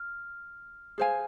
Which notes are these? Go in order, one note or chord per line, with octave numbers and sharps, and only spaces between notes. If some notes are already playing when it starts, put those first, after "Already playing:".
Already playing: F6
G#4 C5 F5 G#5